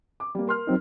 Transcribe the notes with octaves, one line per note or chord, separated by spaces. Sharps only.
D6
G3 A#3
A#4 C6 F6
F#3 C4 D#4